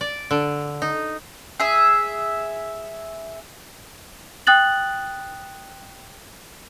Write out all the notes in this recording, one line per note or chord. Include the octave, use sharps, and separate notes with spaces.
D5
D3
D#4
G#4 E5
G5 D#6 F#6 A6 F#7